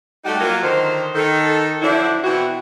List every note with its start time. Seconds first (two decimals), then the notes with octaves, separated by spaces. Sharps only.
0.25 G3 A3 D#4 F#4 G4
0.40 F#3 A#3 F4
0.62 D3 D#3 C5
1.15 D#3 A4
1.81 D3 F3 F#3 D4 E4
2.24 B2 E3 B3 C4 E4 F#4